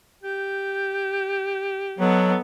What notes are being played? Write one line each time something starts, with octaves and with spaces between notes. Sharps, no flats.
G4 G6
F#3 B3 D#4 A4